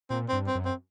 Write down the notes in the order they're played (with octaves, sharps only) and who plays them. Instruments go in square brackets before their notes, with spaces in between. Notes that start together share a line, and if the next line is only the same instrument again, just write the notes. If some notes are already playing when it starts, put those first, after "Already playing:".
[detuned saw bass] A#2 [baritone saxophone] C4
[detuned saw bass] G2 [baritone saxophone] C4
[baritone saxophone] C4
[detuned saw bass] F#2
[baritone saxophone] C4